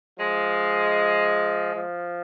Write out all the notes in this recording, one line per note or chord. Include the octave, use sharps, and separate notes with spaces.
F3 G#3
F3